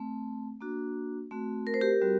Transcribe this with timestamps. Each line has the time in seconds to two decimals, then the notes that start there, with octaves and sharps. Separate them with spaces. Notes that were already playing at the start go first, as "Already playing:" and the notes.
Already playing: A3 C4
0.61 A#3 D4 F#4
1.31 A3 C4 F#4
1.67 A#4
1.74 C5
1.81 G4 A#4
2.01 G3 C4 F#4